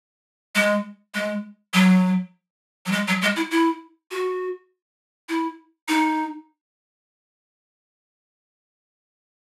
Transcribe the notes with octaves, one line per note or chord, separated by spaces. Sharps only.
G#3
G#3
F#3
F#3
G#3
F#3
G#3
E4
E4
F#4
E4
D#4